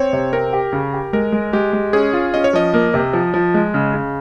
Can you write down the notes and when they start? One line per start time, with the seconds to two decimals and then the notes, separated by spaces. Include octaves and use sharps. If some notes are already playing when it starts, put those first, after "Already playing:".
Already playing: C4 C#5
0.13 C3
0.33 C4 A#4
0.53 G4
0.72 C#3
0.93 G4
1.13 G#3 A#4
1.32 G#3
1.53 G#3 G4
1.73 G#3
1.93 C#4 G#4
2.13 F4
2.34 C#4 D#5
2.44 C#5
2.53 F3 D#5
2.73 A#3
2.94 C3
3.13 F3
3.34 F3
3.54 G#3
3.74 C#3
3.94 C#3